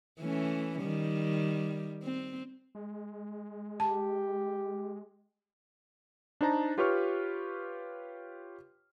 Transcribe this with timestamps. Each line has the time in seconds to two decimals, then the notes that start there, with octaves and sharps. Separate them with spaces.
0.20 E3 A3 C#4
0.78 D#3 G3
2.03 C4
2.75 G#3
3.80 G4 A5
6.41 D4 D#4 C5 A5 A#5
6.78 F4 G4 B4 C#5 C#6 F6